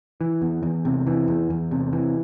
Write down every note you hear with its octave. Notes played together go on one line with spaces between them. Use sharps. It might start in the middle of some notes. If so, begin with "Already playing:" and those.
E3
E2
E2
C3
E3
E2
E2
C3
E3